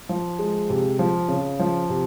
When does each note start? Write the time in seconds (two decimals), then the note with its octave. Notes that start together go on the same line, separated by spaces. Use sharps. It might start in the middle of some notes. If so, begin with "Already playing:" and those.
0.09 F3
0.39 G#3
0.70 C3
0.99 F3
1.28 C#3
1.60 F3
1.89 C3